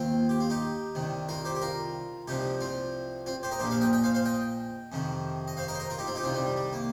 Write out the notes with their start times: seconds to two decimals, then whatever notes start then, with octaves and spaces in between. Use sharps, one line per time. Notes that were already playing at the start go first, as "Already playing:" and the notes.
Already playing: D#2 D#3 C4 F4
0.29 G4
0.40 F4
0.50 D#4 G4
0.95 C2 C3 D#3
1.29 F4 A#4
1.45 G4 C5
1.55 G4
1.62 F4 A#4
2.28 C2 C3 F3 D#4 G4
2.61 C4 F4
3.26 C4 F4
3.43 G4 C5
3.51 A#4 D#5
3.59 A#1 A#2 F3 G4 C5
3.71 C5 F5
3.81 D#5 G5
3.93 D#5 G5
4.04 C5 F5
4.15 C5 F5
4.26 D#5 G5
4.92 F2 C3 D#3
5.48 D#5
5.57 C5 F5
5.68 A#4 D#5
5.74 C5
5.80 A#4 D#5
5.90 F4 A#4
5.98 D#4 G4
6.07 C4 F4
6.15 D#4 G4
6.23 C2 C3 D#3 C4 F4
6.34 G3 C4
6.45 G3
6.56 G3
6.73 A#3